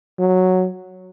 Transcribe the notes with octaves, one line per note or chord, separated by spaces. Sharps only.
F#3